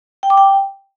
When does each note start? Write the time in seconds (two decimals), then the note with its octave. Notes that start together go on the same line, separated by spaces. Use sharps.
0.23 G5
0.30 D6
0.37 G5